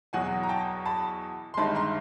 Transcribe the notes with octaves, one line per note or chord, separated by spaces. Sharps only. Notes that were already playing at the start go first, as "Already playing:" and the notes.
E2 B2 F#3 F#5 G#5
A#5
G5 A5
A5 B5
C6
G1 G2 D#3 G#3 A5 B5
A#5 C6